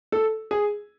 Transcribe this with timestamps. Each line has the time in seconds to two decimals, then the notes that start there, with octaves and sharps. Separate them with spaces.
0.12 A4
0.51 G#4